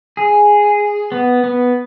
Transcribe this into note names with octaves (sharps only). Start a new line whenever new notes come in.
G#4
B3
B3